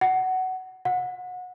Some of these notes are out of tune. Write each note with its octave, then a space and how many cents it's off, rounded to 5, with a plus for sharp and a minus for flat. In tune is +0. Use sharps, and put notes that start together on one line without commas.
F#5 +15
F#5 -30